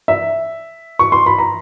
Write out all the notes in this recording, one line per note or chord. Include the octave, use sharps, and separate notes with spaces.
E5
C#6
C6
B5
A#5